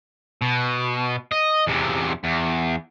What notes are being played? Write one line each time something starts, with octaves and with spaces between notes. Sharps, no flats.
B2
D#5
E2 C3
E2